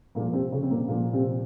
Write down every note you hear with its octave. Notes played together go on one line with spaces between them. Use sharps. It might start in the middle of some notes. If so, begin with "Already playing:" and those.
A#2 A#3
F3
C3 C4
C#3 C#4
C4
A#2 A#3
A#2 F3 A#3
C3 C4